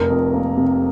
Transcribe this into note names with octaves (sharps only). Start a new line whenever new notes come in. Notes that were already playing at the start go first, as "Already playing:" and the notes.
Already playing: F1 A#4
F2
A#3
C3